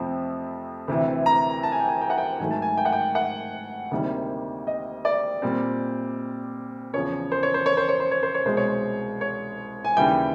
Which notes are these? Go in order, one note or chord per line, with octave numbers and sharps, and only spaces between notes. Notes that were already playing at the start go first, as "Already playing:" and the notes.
Already playing: F2 C3 F3 A3 C4
D2 C3 E3
A#5
A5
G#5
G5
G#5
G5
F#5
G5
G#2 D#3 F#3 A3 G#5
A5
G#5
G5
F#5
G5
F#5
D2 C3 D#3 G3 A#3
D#5
D5
A#2 G3 C4
E2 C#3 F3 C#5
C5
C#5
C5
C#5
C5
C#5
C5
C#5
C5
C#5
C2 B2 G#3 C5
C#5
C5
C#5
G#5
D#2 C#3 E3 G3 G5